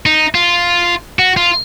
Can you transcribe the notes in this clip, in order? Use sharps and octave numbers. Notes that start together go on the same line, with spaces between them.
D#4
F4
F#4
F4